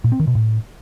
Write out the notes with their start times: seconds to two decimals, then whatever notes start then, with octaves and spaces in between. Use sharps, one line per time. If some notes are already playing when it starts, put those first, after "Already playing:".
0.04 A#2
0.12 C4
0.20 D#3
0.27 B2
0.35 A2